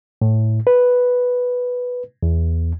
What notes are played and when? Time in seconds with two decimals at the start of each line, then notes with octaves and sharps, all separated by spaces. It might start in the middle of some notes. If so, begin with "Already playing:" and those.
0.22 A2
0.67 B4
2.23 E2